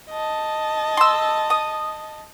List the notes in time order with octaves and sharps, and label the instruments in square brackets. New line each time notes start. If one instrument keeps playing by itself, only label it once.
[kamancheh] D#5 A5
[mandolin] C6 E6
D#6